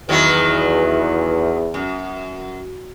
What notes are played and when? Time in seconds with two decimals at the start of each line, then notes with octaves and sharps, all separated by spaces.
0.09 E2 D#3 F#3 B3
1.74 F#2